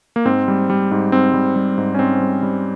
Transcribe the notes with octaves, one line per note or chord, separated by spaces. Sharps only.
A#3
G#2 C4
G3
G3
G#2
G#2 C4
G3
G3
G#2
C#4
G#2 C4
G3
G3